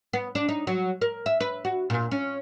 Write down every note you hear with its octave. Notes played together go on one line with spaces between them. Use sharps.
B3
D4
D#4
F#3
A#4
E5
B4
F#4
A#2
C#4